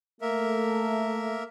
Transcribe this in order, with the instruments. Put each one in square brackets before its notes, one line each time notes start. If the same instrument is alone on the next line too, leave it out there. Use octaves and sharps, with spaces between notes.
[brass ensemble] A3 [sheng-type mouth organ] A#3 A#4 E5